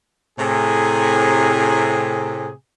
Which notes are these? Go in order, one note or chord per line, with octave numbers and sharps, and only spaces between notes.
A2 C3 G#4